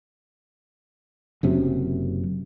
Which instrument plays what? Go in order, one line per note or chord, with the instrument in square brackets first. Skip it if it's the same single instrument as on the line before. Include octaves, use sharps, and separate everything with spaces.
[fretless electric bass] F#1 F#2 C3